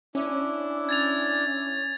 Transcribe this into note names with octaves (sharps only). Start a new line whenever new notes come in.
C#4 D4 E4
G#6 A6 F7